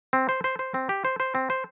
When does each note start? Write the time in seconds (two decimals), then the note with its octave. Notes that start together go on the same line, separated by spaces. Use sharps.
0.13 C4
0.29 C5
0.44 C5
0.59 C5
0.74 C4
0.89 G4
1.05 C5
1.20 C5
1.35 C4
1.50 C5